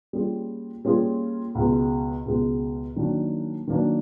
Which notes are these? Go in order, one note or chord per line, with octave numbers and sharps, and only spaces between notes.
G3 A#3 C#4 F4 G#4
G3 A#3 C#4 F4 G#4
C#2 B2 G#3
C#2 B2 G#3
D#3 F#3 A#3 D4
D#3 F#3 A#3 D4